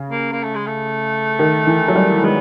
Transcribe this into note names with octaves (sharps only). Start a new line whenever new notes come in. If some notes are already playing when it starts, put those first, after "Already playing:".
Already playing: C#3
A#3
A#3
A3
G#3
A3
D#3
E3
F#3
G3
G#3 B3